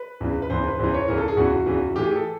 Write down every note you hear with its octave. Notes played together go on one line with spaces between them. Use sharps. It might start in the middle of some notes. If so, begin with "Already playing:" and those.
Already playing: B4
E2 C#3 E3
B4
E2 C#3 E3 C5
B4
E2 C#3 E3 C5
C#5
E2 C#3 E3 A#4
A4
G#4
E2 C#3 E3 F#4
E2 C#3 E3
A2 E3 G4
G#4
A4